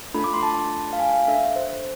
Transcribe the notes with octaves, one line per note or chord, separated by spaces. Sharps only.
A3 D4 F4 A4 B5
D6
C6
A5
F5
G#5
F5
D4 A4 E5
C5